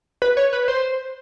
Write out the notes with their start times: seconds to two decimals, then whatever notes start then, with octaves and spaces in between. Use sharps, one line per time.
0.22 B4
0.37 C#5
0.53 B4
0.68 C5